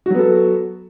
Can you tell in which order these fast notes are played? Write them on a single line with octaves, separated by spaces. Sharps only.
F#4 F#3 B3 A4